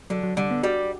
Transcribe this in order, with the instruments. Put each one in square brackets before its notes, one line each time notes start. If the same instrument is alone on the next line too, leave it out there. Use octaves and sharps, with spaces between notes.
[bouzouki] D3 [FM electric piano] F#3
[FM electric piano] F#3
[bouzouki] D3 [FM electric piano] G3
[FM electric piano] B3
[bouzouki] G3 [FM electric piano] F#4